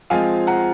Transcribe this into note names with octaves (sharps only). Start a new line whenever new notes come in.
F3 G#3 C4 F4 F5 G#5
F#5 A#5